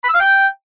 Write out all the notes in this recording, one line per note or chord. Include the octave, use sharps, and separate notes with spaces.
B5
E6
F5
G5